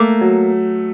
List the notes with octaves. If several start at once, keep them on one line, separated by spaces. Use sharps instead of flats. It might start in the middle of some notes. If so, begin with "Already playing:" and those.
Already playing: A3 A#3
F#3